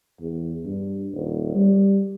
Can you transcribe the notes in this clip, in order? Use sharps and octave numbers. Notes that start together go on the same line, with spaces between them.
E2
G2
D#1
G3